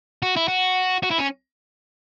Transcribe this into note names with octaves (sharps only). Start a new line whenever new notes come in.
F#4
E4
F#4
F#4
E4
C#4